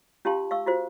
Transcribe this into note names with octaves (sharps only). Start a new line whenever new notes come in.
C#4 F4 G4 F5 A5 C6
F5 C#6 E6
F4 F#4 C5